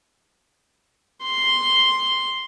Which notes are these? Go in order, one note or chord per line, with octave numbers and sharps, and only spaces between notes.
C6